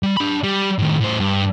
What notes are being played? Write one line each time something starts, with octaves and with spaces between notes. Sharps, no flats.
G3
D4 B5
G3
A2 D#3
A2 C5
G2